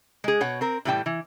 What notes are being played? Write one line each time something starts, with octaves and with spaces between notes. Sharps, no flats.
G#3 G#4
B2 C#5 F#5
C4 A#4
A2 E3 G3 E4 G5 A5
E3